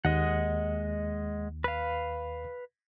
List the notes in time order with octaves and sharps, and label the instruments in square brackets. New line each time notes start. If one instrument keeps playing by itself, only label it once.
[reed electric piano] D#2 [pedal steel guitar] G#3 D#5 F#5
[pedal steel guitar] B4 F5